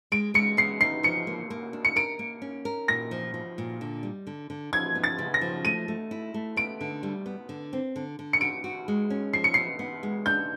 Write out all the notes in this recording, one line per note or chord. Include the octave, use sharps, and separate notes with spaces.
G#3 D7
G#3 C#7
B3 C7
D#4 C7
F3 C#7
A#3
A#3
D4
C#7
A#4 D7
A#3
C#4
A#4
A#2 A#6
F3
F3
A#2
D3
G3
D3
D3
F3 G#6
B3
A6
C#3
A#6
F3
A3 D#7
A3
E4
A3
B3 D7
D3
G3
B3
D3
C4
D3
D3
C#7
F#4 D7
F#4
G#3
C#4
F3 C7
C#7
B3 C7
B3
G#3
D4 G6